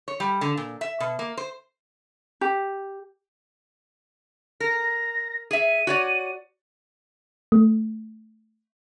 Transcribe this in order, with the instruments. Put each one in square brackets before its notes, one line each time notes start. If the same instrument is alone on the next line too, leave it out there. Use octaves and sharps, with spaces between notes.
[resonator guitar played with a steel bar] C#5
G3
D3
A#2
E5
B2
A#3
C5
[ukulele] G4
[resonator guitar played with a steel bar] A#4 [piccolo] A#6
[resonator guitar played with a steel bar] G#4 E5 [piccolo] D#7
[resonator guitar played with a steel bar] F#4 C#5 D5
[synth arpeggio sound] A3